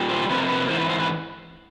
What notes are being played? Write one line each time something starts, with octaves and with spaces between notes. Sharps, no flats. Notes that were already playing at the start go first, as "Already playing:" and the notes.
Already playing: A#2 G3
C5
F2 C3 A#3 B4
A#4
B4
G#2 E3 C5
B4
C5
B4